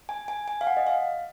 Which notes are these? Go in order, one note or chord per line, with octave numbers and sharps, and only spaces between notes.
G#5
G#5
G#5
F5
F#5
D#5
F5